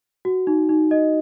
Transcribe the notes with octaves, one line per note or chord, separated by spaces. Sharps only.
F#4
D#4
D#4
D#5